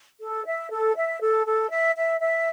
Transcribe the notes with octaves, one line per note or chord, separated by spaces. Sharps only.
A4
E5
A4
E5
A4
A4
E5
E5
E5